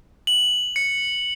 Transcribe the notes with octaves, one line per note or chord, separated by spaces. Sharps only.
F#7
C#7